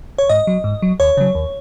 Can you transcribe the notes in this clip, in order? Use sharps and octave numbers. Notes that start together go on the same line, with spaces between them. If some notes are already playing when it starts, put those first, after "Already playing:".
C#5
G#2 D#5
F#3
G#2
F#3
D#2 C#5
C#3 F#3
D#2